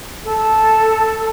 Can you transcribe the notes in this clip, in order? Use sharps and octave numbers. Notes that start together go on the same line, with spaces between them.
A4